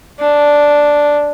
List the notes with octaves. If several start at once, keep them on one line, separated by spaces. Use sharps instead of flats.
D4